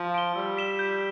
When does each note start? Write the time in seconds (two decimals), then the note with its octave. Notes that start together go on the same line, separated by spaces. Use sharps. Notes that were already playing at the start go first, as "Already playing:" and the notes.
Already playing: F3
0.14 D7 G7
0.36 G3 E6
0.57 B6 E7 G7
0.79 G6